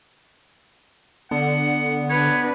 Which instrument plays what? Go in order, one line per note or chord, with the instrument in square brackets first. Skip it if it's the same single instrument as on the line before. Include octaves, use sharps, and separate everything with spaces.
[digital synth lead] D3 [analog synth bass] B3 [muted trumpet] F#5
[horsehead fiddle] D4 B4 [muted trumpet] C#5